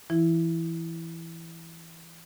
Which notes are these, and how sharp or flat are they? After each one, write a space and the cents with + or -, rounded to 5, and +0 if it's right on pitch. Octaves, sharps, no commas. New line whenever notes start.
E3 +10 E4 +0